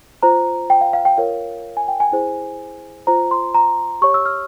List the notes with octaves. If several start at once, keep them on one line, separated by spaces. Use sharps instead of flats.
F4 C5 A#5
G5
F5
F5
G5
F4 A#4 C#5 F5
G#5
G5
G#5
E4 G#4 C5
F4 C5 A#5
C6
A#5
G4 C#5 C#6
E6
F6